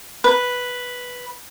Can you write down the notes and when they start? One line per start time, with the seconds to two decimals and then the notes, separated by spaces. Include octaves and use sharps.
0.24 B4